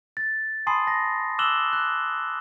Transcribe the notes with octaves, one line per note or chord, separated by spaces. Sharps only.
A6
G#5 A5 B5 C6 D#6 C7
A5 A#6
D6 E6 F#6 E7 F#7 G7
F#6